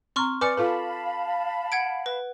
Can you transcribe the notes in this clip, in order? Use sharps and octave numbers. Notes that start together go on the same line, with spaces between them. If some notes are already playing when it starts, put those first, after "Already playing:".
C4 A#5 C6 C#6 F6
B4 D5 G#5 D6 F6 C#7
F4 A4 B4 F5 A5 B5
F#5 G#6 D7
B4